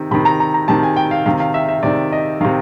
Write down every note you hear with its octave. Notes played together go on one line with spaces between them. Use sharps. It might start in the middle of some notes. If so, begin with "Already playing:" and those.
Already playing: C3 D#3
C3 D#3 B5
A#5
A#5
A#5
C3 D#3 A5
G#5
G5
F5
C3 D#3 F5
F5
E5
E5
C3 D#3 D5
D#5
C3 D#3 F5